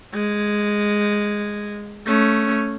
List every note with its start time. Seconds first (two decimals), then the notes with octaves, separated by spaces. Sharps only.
0.14 G#3
2.07 A3 C#4